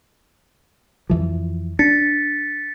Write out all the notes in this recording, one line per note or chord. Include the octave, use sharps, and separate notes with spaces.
F2 E3 F3
D4 A6 B6 C#7